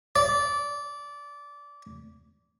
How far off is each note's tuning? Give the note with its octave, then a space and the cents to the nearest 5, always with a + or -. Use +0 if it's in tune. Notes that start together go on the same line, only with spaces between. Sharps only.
D5 -20